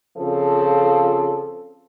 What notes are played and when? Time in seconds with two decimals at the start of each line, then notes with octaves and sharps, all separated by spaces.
0.17 C#3 F3 C4 F4 A4